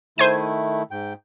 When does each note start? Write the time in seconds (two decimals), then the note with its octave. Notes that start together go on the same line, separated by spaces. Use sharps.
0.18 D#3 A3 E4 C5 G#6 D#7
0.91 G#2 G5